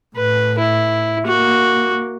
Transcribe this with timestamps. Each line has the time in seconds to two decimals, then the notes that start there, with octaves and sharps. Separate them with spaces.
0.16 A2 B4
0.58 E4
1.26 A#3 F#4